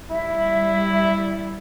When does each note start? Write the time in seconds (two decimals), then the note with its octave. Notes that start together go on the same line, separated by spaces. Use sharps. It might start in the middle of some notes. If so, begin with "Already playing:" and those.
0.10 G3 E4 E5